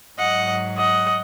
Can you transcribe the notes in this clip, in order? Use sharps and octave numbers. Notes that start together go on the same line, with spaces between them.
G#2 F#3 D#5 F#5
D#5 F#5